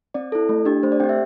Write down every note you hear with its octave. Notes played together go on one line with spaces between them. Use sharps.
C4 D5
E4 A4
A3
D4 G4
A3 C5
D5
C4 G4 G5
E5